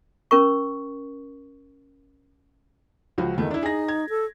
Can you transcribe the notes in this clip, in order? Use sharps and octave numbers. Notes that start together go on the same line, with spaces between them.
C#4 A#4 C#6
C#2 F3 F#4
E2 D#3 A3
D4 E4
D#4 G#4 A#6
G#6
A4